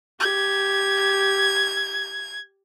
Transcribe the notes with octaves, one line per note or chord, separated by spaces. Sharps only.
G4 G#6